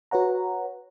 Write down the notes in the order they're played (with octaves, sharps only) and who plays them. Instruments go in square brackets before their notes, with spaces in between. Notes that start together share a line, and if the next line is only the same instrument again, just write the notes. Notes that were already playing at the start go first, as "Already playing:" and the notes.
[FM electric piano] F#4 B4 C#5 F#5 A#5